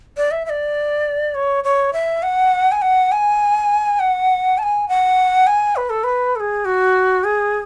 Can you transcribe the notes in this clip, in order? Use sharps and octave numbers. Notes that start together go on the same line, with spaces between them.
D5
E5
E5
D5
C#5
C#5
E5
F#5
G#5
F#5
G#5
F#5
A5
G#5
F#5
G#5
B4
A4
B4
A4
G#4
F#4
G#4